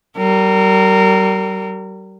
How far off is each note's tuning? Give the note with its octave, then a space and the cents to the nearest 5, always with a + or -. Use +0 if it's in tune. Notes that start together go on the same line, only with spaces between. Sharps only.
G3 -40 A#4 -25